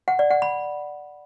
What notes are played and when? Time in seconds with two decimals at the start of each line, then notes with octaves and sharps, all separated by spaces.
0.08 F#5
0.19 D5
0.31 F#5
0.42 B5